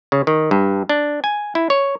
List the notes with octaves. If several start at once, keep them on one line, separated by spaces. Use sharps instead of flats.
C#3
D#3
G2
D4
G#5
E4
C#5